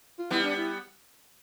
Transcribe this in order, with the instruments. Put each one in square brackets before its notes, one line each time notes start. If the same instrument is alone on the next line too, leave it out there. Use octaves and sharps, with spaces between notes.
[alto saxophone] F4
[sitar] G3 B3 [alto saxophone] E4
[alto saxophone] D4
E4